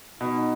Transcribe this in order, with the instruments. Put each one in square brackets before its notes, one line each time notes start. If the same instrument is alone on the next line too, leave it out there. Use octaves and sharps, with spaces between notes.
[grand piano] B2 [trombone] D#4